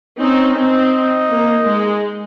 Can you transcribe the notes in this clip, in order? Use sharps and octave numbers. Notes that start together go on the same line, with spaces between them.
C4 C#4 D#4
C4 D#4
A#3
G#3